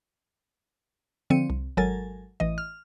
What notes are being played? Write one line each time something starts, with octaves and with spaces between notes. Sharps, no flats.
D3 F3 C4 C#7 D#7
C2
G#1 F#3 A4 A#4 G#5 A6
A1 E3 D#5
F6